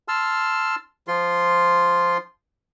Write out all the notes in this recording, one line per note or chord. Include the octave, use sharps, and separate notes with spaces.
A5 C6 E6 F6
F3 F4 C6